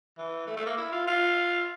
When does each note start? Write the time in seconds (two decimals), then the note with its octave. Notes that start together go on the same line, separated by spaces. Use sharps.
0.18 E3
0.47 A3
0.57 A3
0.67 A#3
0.78 E4
0.92 F4
1.08 F4